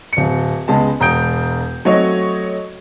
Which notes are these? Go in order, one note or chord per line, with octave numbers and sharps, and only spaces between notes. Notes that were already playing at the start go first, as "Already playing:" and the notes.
D1 C#7
C#2 G#3 B3 A5
E1 A#5 D#6 G6 D7
F#3 A3 C4 F#4 C#5 D#5